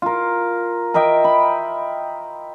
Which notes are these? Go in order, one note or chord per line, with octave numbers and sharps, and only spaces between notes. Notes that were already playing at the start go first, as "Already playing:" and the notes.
F4 A#4
A#4 D#5 E5 G5
B5